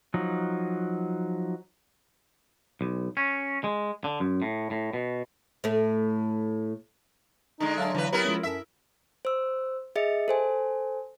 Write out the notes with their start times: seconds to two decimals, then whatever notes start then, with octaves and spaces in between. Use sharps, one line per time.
0.14 F3 F#3 D#4
2.81 B1
3.17 C#4
3.64 G#3
4.04 D3
4.20 F#2
4.42 A2
4.71 A2
4.93 B2
5.64 A2 A3
7.60 D3 G#3 D#4
7.78 F#3 E5 F5 A5
7.95 D3 E3 B4 D5 F5
8.12 B3 E4 G4 A#4 B4
8.25 F3 G#3 C#4
8.43 F#2 A4 E5 B6
9.25 C5 E6
9.96 G#4 D#5 E5 A6 C#7
10.28 A4 C5 G#5